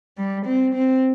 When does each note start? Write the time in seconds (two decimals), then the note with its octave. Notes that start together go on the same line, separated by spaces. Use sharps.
0.18 G3
0.46 C4
0.74 C4